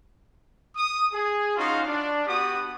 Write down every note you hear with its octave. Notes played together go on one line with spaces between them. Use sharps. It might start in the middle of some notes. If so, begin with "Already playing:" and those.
D#6
G#4
C#4 D#4 F4 F#4 F5
D4
B3 F#4 G4 D#6